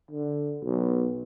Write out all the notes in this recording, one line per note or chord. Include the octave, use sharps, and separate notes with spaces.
D3
B1